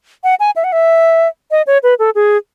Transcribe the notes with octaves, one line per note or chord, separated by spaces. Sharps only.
F#5
G#5
E5
F#5
E5
D#5
C#5
B4
A4
G#4